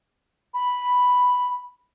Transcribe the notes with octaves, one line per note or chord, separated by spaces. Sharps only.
B5